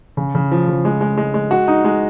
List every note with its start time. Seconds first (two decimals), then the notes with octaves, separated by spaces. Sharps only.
0.17 C#3
0.35 C#3
0.51 F3
0.68 C#3
0.85 G#3
1.01 G#3
1.17 G#3
1.34 G#3
1.51 F#4
1.68 D#4
1.85 G#3